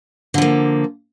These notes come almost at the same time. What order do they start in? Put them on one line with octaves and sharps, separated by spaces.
D3 F3 A#3